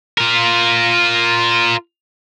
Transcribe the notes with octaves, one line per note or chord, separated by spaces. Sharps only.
F4 A#4